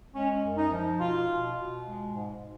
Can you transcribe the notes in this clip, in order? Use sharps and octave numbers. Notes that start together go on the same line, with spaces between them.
G#3 C#4
F#2
D#4
F3
B2 F4
B2
B2
G#3
G#2